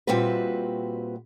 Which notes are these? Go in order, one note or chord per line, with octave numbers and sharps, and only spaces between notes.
A#2 G3 C4 E4 F#4 B4